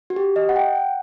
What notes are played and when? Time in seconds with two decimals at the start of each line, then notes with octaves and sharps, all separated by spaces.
0.10 F#4
0.16 G4
0.36 D#5
0.49 F#5
0.56 G5
0.76 F#5